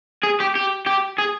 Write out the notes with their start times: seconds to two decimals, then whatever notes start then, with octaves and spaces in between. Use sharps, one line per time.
0.23 G#4
0.40 G4
0.56 G4
0.87 G4
1.18 G#4